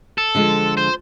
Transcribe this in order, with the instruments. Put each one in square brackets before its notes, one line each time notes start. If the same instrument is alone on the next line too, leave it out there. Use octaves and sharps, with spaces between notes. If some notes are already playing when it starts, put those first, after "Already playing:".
[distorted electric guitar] A4
[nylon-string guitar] D3 F3 G#3
[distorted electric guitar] C5